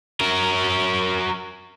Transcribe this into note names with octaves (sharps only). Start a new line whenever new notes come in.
F#3 A#4